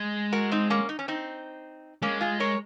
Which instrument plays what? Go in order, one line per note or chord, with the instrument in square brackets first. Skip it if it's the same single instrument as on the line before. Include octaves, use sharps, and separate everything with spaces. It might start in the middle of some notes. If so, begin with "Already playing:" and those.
Already playing: [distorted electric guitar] G#3
[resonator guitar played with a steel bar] F#4 A#4
C4 D#4
A#3 C#4
D#4
C#4
C4 D#4
[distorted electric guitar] G#3 [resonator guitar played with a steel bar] A#3 C#4
[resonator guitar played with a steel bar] F4 G#4
A#4 C#5